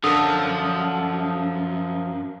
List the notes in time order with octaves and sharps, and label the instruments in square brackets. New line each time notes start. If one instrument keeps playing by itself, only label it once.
[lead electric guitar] F#2 [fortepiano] D3 A4 [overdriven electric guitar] F3 [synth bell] D#6